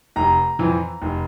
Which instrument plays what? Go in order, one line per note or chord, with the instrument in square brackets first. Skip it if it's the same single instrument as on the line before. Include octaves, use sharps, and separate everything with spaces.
[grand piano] F1 A#5
F2 E3
F1